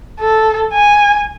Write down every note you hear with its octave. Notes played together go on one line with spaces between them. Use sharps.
A4
G#5